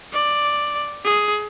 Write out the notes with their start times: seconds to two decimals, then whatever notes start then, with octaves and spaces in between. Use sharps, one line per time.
0.13 D5
1.04 G#4